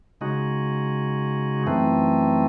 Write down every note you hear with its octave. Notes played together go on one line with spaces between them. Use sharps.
C#3 G#3 D#4 F#4
F#2 E3 A3 C4 D#4